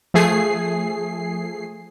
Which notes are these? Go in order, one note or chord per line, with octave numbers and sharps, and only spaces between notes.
F3 A3 G#4 C7